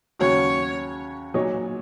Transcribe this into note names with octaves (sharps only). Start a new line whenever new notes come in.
D#2 C#3 F#3 C#4 F#4 C#5
A#2 F#3 D#4 G#4 C#5